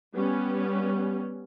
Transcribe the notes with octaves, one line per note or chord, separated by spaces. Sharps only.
G3 B3 C#4